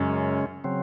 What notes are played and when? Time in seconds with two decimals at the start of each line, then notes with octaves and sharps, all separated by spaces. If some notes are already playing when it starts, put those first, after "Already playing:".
Already playing: F#2 C#3 G#3 C#4
0.64 C#3 F#3 C4